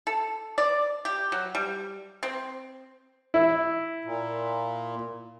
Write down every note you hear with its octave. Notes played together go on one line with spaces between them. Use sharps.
A4
D5
G4
F#3
G3
C4
E4
A#2